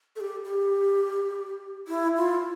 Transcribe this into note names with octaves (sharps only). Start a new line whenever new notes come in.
A4
G4
G4
E4
F4